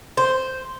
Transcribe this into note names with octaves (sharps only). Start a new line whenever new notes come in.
C5